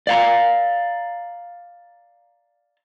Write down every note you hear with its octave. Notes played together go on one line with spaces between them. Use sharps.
D5 F5 A#5